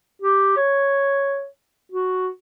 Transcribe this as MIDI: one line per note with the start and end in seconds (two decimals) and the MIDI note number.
0.22 0.53 67
0.57 1.47 73
1.92 2.30 66